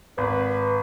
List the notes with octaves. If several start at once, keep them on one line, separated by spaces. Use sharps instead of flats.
G#1 B4